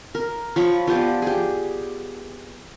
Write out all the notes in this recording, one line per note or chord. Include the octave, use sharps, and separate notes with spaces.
A#4
F3 C#5 B5 C#6
F3 B3 G4 D5
G4 G#4